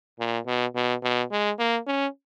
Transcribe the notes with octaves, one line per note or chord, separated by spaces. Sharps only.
A#2
B2
B2
B2
G#3
A#3
C#4